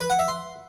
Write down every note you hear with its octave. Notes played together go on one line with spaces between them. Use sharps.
B4
F#5
E5
C6